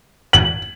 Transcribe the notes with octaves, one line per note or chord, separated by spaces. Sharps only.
F#7